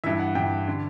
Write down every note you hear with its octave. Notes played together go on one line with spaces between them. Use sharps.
G2 E3 E5
F#5
G2 E3 G5
D3